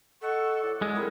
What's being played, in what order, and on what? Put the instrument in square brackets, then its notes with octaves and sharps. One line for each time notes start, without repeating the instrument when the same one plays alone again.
[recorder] A4 [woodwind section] D#5 F#5 C#6
[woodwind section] A2 D5 F#5
[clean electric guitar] G#3
[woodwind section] D3 C4 A#4 [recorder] E4